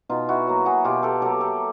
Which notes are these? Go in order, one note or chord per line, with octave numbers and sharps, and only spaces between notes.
B2 D#4 F4
E4 F#4
F#3 A#3
F#4 G#4
B2 F4 G4
G4 A4
F#3 A#3 G4 A4
G4 A4